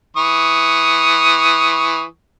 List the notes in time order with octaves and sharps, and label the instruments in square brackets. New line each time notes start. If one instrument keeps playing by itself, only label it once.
[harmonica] E3 C#6 D#6